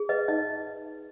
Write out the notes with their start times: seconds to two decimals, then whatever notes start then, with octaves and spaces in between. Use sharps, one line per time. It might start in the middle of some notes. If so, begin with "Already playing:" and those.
Already playing: G#4
0.09 B4 D#5
0.28 D#4 D#5